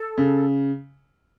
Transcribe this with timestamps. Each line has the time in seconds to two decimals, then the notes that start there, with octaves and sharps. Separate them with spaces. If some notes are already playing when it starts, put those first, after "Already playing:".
Already playing: A4
0.17 C#3